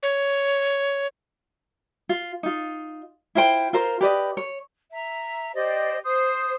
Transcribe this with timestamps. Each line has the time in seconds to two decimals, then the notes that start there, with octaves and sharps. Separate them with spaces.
0.03 C#5
2.09 F4
2.43 D#4 F4
3.35 E4 F4 C5 G5
3.73 F4 A#4 C5
4.01 G4 B4 D5 D#5
4.37 C#5
4.91 E5 A#5
5.54 G4 C5 D5 D#5
6.03 C5 D#6